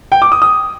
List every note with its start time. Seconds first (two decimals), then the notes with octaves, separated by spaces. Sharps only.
0.12 G5
0.22 D6
0.32 D#6
0.42 D#6